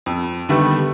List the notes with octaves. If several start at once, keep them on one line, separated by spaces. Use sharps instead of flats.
F2
D3 D#3 G3 A3 B3